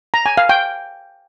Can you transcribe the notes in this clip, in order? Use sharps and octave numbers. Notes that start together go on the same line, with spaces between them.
A#5
G#5
F5
G5